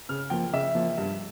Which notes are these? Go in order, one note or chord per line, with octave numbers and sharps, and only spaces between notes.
C#3 F6
F3 A#3 G5
C#3 E5
F3 A#3
G2